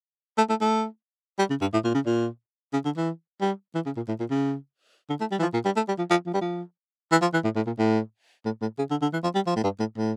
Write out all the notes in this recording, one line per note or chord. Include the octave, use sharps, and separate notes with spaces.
A3
A3
A3
G3
C#3
G2
A2
A#2
C#3
A#2
C#3
D3
E3
G3
E3
C#3
A#2
A2
A#2
C#3
D3
A3
G3
E3
F3
A#2
G3
A3
G3
F3
F3
F3
G3
F3
E3
F3
E3
A2
A2
A#2
A2
A2
A2
C#3
D3
D3
E3
F3
G3
F3
A2
G2
A2
A2